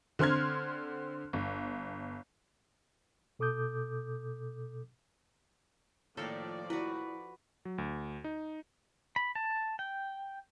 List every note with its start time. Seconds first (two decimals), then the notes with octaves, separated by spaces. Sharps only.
0.19 D3 C4 C6 F6 G#6
1.33 G1
3.39 B2 A4 D6 D#6 G6
6.17 A2 D#3 F3 A#3 A4 D5 E5 F5
6.70 E4 F#4 B4
7.65 F#3
7.78 D2
8.24 D#4
9.16 B5
9.35 A5
9.79 G5